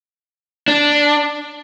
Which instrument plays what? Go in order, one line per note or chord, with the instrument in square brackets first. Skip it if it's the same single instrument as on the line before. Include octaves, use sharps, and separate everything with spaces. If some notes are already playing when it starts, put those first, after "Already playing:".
[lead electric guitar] D4